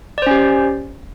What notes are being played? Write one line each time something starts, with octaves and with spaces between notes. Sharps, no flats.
C#4 G4 C5 D5